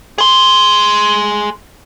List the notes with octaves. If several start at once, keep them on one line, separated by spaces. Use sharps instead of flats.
G#4 C6